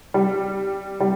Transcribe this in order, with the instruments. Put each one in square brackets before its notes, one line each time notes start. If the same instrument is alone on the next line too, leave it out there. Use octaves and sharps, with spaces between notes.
[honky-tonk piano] G3
G3